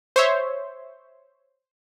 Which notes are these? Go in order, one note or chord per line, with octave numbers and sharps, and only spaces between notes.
C5 C#5 E5